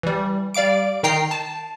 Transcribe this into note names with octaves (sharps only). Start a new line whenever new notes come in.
E3 G3
G3 D5 F5 D6 D7
D#3 D#4 G5 A#5 C7
A5